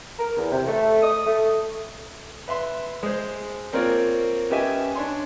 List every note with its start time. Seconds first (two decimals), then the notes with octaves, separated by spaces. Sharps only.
0.19 A#4
0.37 E2
0.52 C3
0.68 A3
1.03 D#6
1.27 A3
2.48 B4 E5 C6
3.03 G#3 C5
3.73 A#3 C4 F4 A#4 C#5 D5
4.50 B3 C#4 G4 D#5 E5 G#5
4.95 D4 C#5 C6